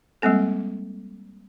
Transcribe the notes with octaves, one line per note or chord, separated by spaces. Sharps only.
G3 G#3 A#3 C4 A4